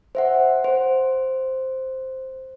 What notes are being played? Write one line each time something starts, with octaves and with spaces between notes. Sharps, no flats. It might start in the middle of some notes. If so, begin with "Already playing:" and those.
C5 E5 F#5
C5